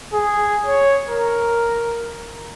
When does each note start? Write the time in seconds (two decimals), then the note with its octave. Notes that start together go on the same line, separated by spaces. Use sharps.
0.13 G#4
0.66 C#5
1.09 A#4